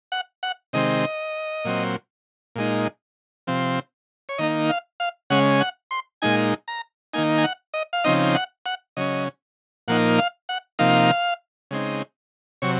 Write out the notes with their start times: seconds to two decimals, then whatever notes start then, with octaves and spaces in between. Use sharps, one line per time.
0.12 F#5
0.43 F#5
0.73 C3 D#3 G#3 C4 D#5
1.65 A#2 F#3 C4
2.56 A#2 G#3 D#4
3.47 C3 F3 C4
4.29 C#5
4.38 D#3 A#3 D#4 D#5
4.69 F5
5.00 F5
5.30 C#3 G#3 C#4 F#5
5.60 F#5
5.91 C6
6.22 A#2 G#3 D#4 G#5
6.68 A#5
7.14 D#3 A#3 D#4 G#5
7.38 G#5
7.44 F#5
7.74 D#5
7.93 F5
8.04 C#3 F3 C4 D#4 D#5
8.35 F#5
8.66 F#5
8.97 C#3 F#3 C#4 D#5
9.88 A#2 F3 A#3 D#4 F#5
10.18 F5
10.49 F#5
10.79 C3 F3 A#3 D#4 F5
11.71 C#3 G#3 C4 D#4
12.62 C3 F#3 C#5